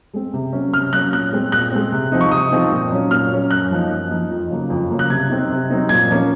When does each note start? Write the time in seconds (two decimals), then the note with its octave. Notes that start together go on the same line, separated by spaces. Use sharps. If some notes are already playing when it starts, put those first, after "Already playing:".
0.14 G#3 C4
0.34 C3
0.53 F#3 A#3 C#4
0.73 C3 F6
0.93 F#3 A#3 C#4 F#6
1.12 A#2 F#6
1.32 G#3 C4
1.52 A#2 F#6
1.72 G#3 C4
1.92 C3
2.12 F3 C4 D#4
2.21 C#6
2.31 C3 D#6
2.52 F3 C4 D#4
2.72 A#2
2.91 F#3 C#4
3.11 A#2 F6
3.31 F#3 C#4
3.50 F#2 F#6
3.71 F3 A#3 D#4
3.91 F#2
4.11 F3 A#3 D#4
4.30 F2
4.50 C#3 F#3 A#3
4.70 F2
4.90 C#3 F#3 A#3
4.99 F#6
5.10 C3 G#6
5.29 F#3 C4 D#4
5.50 C3
5.70 F#3 C4 D#4
5.89 A#2 G#6
6.09 F3 A#3 C#4